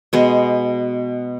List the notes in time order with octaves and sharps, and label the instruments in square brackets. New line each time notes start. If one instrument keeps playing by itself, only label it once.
[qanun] B2 G#3 B3